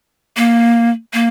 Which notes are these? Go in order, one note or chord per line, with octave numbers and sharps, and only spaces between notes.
A#3
A#3